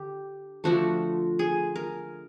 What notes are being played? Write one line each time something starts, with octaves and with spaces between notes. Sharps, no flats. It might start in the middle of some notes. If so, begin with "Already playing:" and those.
Already playing: D3 G4
D3 F3 A3 F#4
G#4
A#4